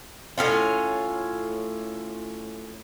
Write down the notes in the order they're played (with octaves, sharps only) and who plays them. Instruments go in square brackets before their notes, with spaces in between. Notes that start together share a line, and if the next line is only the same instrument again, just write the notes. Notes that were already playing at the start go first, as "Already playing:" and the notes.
[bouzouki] A2 C3 C#4 F4